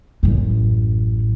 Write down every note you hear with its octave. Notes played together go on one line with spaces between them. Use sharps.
A1 F#2